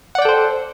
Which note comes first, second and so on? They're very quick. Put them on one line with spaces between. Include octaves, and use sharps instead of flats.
F#5 D5 G5 A4 C5